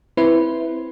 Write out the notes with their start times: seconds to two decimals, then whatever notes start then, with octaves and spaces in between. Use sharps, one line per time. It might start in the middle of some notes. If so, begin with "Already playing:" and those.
0.17 C4 E4 B4 C5